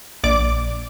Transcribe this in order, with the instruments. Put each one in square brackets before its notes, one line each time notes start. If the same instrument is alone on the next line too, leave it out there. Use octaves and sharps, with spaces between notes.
[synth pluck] A#1 D5 D6 D7